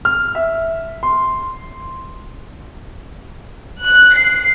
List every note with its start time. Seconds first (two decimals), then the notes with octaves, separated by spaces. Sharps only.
0.05 F6
0.35 E5
1.03 C6
3.81 F#6
4.15 C7